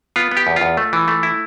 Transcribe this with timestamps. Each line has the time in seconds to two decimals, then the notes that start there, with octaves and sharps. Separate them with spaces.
0.16 B3 F4
0.31 B3
0.37 G4
0.47 E2
0.56 F4
0.61 E2
0.77 A3
0.93 E3
1.08 A3
1.23 E4